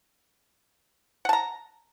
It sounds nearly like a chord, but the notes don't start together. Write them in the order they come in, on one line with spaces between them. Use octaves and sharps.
F#5 A5 A#5